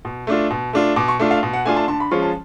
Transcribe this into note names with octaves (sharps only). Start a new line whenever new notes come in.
B2
A3 D4 F4
B2
A3 D4 F4
B2 D6
C#6
A3 D4 F4
F5
B2
F#5
A3 D4 F4 G#5
A5
D3 A5
B5
F3 G#3 C#4 F4 C#6
A5